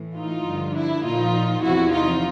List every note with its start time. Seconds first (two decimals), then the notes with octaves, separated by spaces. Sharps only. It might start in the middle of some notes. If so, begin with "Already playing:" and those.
Already playing: A2 E3
0.17 D#4 F4
0.46 G2 D3 F3
0.75 D4 E4
1.04 A#2 F3 D#4 F4
1.63 E2 C3 F3 E4 F#4
1.93 D#4 F4